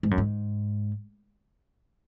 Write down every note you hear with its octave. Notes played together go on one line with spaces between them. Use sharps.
G#2
F#2
G#2